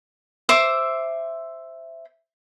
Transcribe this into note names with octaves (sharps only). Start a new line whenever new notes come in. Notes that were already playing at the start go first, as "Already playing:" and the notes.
C5 E5 D6